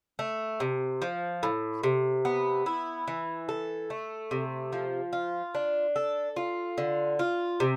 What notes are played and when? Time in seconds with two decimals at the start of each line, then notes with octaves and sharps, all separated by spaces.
0.19 A3
0.60 C3
1.02 F3
1.43 A2
1.83 C3
2.25 B3
2.66 E4
3.08 E3
3.49 A4
3.90 A3
4.31 C3
4.73 F3
5.13 F4
5.55 D4
5.96 A4
6.36 F4
6.78 D3
7.19 F4
7.60 C3